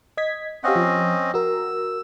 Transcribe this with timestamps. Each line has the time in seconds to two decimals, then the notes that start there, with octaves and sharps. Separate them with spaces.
0.17 D#5 G#6 B6
0.64 C4 C#4 G4 D#5 F5 F#5
0.76 F3
1.34 F#4 A#4 E6